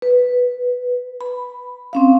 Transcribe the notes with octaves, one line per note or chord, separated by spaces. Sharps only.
B4
B5
C4 C#4 F5